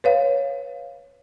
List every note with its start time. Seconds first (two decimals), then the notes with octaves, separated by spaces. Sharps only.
0.04 B4 C#5 F5